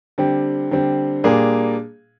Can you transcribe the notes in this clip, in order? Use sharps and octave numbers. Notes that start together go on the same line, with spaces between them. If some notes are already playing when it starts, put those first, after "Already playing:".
D3 G3 C4
D3 G3 C4
A#2 G3 A#3 D4 G#4